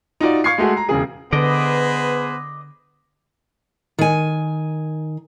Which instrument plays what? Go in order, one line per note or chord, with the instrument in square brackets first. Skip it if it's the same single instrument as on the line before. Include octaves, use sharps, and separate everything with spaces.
[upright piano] D#4 F4 F#4 D5
F5 C#6 G#6 C7
G#3 A3 F#4 G#4
A#5
E1 C#3 G#4
[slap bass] D3 [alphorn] B3 [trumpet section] G#4 B4 C5 [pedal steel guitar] D5 D#5
[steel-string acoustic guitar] D#3 G#5